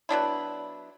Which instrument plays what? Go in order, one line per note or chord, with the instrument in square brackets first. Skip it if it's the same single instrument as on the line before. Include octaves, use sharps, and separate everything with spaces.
[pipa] F#3 B3 D4 E4